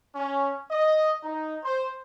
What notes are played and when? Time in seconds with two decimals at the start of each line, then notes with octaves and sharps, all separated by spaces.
0.16 C#4
0.71 D#5
1.24 D#4
1.65 C5